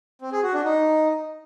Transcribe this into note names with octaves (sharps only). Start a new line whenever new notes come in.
C4
G#4
F#4
D4
D#4